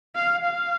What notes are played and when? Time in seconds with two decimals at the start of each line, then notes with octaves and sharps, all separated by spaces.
0.15 F5
0.45 F5